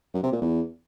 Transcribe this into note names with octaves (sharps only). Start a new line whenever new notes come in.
F#2
C3
A#2
E2